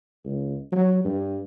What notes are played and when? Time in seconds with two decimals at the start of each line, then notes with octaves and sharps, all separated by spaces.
0.25 C#2
0.72 F#3
1.05 G2